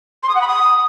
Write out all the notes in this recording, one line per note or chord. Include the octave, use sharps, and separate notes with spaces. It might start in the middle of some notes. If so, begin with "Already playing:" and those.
C6
D#6
F#5
B5
D#6